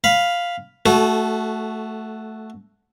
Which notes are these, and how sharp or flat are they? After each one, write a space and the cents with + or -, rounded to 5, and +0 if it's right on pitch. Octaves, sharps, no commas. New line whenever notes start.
F5 +0 B5 +0
A3 +0 F#4 +0 A4 -25